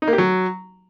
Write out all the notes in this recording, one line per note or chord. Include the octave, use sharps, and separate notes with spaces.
D#4
A#3
G4
F#3